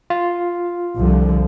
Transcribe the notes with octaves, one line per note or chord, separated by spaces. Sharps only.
F4
C2 D3 F3